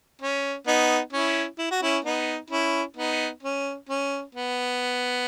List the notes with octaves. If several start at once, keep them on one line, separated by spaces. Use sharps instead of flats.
C#4
B3 D#4
C#4 E4
E4
F#4
C#4 E4
B3 D#4
C#4 E4
B3 D#4
C#4
C#4
B3